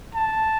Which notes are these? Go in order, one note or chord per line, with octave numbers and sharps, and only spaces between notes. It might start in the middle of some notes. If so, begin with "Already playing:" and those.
A5